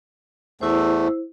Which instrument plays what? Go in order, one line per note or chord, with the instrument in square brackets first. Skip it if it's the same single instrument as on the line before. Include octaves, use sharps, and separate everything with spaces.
[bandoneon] E2 A3 [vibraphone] E4 C5